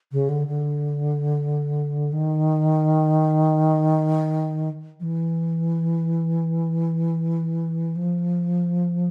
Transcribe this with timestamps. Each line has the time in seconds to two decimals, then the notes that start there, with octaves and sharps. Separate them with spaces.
0.12 C#3
0.29 D3
0.48 D3
2.12 D#3
5.00 F3
5.04 E3
7.96 F3